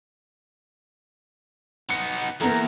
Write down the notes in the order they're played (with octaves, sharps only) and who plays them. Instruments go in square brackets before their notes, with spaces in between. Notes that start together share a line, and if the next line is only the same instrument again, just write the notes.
[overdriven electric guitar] B3 D#4 [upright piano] C#7
[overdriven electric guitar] E2 [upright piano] A#3 B3 A4 [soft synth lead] A#5